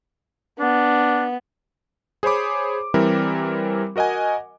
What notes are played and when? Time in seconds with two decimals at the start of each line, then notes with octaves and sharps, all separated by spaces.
0.59 B3 D4
2.23 G#4 C5 C#5 B5 D6
2.94 E3 G3 C4 E4 A#4
3.96 F#4 A#4 D#5 F#5 G#5